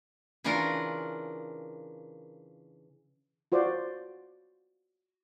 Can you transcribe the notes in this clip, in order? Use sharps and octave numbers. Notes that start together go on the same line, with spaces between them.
C#3 E3 D4 F4 A#4 F#5
F4 F#4 C5 D5